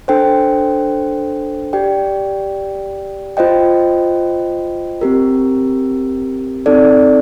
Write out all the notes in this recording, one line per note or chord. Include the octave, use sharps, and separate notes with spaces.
D4 A4 C5 G5
G4 D5 G5
F4 C5 D#5 G5
C4 G4 A#4
C4 D#4 A4 D5